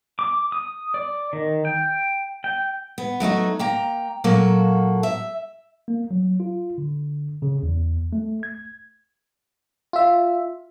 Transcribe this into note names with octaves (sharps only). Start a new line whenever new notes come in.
D6
D#6
D5
D#3
G5
G5
B3
F#3 A3 D#4 F#4
A#3 G5 A#5
A#2 F#3 A#3 F#4 A4
E5
A#3
F#3
F4
D3
C#3
E2
A3
G#6
F4 E5